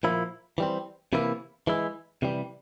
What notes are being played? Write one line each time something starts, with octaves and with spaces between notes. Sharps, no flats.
A#2 F3 A#3 E4
E3 G3 C4
C3 E3 A#3 E4
E3 G#3 E4
C3 E3 G3